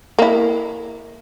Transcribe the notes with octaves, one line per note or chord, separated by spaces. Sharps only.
A#3 E4